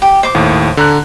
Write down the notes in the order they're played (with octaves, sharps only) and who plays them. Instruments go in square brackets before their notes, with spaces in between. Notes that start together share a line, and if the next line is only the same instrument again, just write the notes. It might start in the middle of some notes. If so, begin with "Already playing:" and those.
[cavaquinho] G4
C5 D6
[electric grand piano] D#2 A2
D3 A#5 F#6